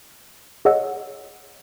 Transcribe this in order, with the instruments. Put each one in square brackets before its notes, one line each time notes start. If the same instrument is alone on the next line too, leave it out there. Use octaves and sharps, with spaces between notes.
[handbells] G#4 C#5 D#5 F#5 E6